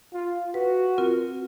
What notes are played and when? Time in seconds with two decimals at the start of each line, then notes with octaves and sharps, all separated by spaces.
0.13 F4
0.54 F#4 B4
0.98 C4 F4 A#4